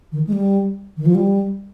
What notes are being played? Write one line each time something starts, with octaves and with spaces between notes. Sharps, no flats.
D#3
G#3
G3
D#3
F3
G3